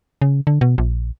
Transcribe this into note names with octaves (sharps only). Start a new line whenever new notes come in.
C#3
D3
B2
A#1